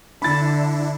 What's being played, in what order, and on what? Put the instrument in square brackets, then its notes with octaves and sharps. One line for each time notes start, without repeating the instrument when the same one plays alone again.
[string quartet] D3 [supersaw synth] D4 E4 [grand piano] B5 A6